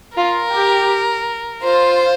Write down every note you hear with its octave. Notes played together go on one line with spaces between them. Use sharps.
F4 A#4
G4
F4 C5